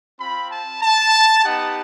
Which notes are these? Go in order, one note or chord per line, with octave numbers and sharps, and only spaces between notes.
C4 F4 B5
A5
A5
B3 D#4 G4 F#5